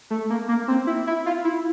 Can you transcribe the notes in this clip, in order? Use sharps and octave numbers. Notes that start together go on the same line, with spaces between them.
A3
A#3
A#3
C4
E4
E4
F4
E4